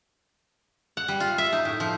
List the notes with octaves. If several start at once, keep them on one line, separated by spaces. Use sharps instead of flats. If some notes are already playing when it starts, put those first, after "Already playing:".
F#5
G3
F4
E5
D#4
A2
F3